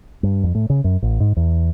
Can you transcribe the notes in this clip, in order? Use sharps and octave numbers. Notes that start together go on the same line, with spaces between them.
G2
F2
A2
C#3
F#2
A1
G#2
E2